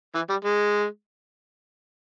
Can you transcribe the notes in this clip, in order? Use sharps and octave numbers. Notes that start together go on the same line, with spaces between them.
E3
G3
G#3